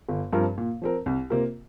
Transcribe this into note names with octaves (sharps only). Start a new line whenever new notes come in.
G1
G2 F3 C4 A#4
A#2
F3 C4 A#4
C2
C3 A#3 F4 A#4